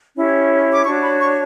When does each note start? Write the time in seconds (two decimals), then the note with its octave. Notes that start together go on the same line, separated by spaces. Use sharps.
0.15 C#4 E4 G4 C#5
0.73 D6
0.85 D4 F#4 C#5 C#6
1.03 B5
1.20 C#6